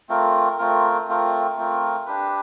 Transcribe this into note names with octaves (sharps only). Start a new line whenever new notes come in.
A3 C4 F4 A#4
A3 C4 F4 A#4
A3 C4 F4 A#4
A3 C4 F4 A#4
D4 G4 B4